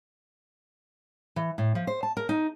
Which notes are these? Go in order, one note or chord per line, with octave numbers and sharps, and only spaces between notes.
E3
A2
F3
C5
A5
A#4
D#4